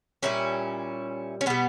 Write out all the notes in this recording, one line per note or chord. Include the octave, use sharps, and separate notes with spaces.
A#2 G3 C#4 E4
C#4
B2 G3 B3